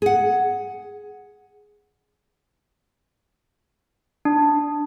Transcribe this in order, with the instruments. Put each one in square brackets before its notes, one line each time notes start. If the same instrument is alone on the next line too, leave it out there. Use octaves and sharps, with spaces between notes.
[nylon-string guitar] G#4 F#5
[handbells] D4